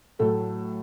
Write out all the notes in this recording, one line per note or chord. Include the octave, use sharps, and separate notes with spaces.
A2 F#3 A3 A4